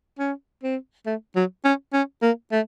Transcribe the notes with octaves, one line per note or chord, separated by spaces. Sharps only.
C#4
C4
A3
F#3
C#4
C#4
A#3
A3